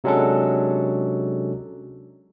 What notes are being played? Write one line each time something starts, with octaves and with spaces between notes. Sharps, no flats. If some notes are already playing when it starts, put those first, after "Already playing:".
C3 F#3 G#3 C#4 D4 A4